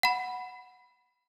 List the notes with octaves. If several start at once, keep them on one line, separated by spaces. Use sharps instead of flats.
F#5 B5